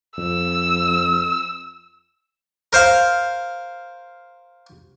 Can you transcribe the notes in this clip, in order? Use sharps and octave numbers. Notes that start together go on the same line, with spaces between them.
F2 E6
A#4 C5 F5